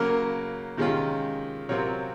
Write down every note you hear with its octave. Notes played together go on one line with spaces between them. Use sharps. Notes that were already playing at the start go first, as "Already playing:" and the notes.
Already playing: C#3 F#3 A#3 A#4
C3 D#3 G#3 C#4 F4
C3 F#3 C4 F4 A#4 C#5